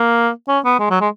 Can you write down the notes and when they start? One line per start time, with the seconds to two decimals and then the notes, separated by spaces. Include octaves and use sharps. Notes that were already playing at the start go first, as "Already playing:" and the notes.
Already playing: A#3
0.48 C#4
0.65 B3
0.79 G#3
0.90 F#3
1.01 G#3